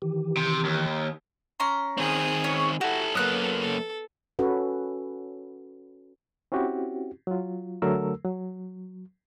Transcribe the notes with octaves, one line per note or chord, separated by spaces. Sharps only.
D#3 E3 G4
C3
D#2
C#4 A#5 C6
D#3 C4 G#4 D#6
C#4 C#5
E4 F#4 G4 A4
F#2 A#3 B3 A4 D#6 F#6
A4
C#4 F#4 A4 B4
C4 C#4 E4 F#4 G4
F#3 F4
D3 F#3 A3 A4 A#4 E6
F#3